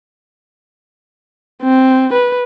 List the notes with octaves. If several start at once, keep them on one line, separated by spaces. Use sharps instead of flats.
C4
B4